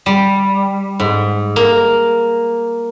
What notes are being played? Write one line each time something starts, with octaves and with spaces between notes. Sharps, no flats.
G3
G#2
A#3